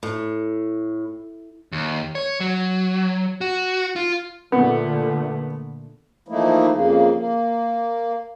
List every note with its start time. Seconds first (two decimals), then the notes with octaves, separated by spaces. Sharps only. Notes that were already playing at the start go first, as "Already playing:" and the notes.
0.03 A2
1.72 D#2
2.15 C#5
2.40 F#3
3.41 F#4
3.96 F4
4.52 A#2 D3 A3 B3
6.28 E3 F3 A3 A#3 D#4 E4
6.72 F2 C#3 A#3
7.14 A#3